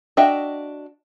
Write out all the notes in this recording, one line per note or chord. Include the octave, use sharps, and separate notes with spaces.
D4 F#4 D#5 E5 G5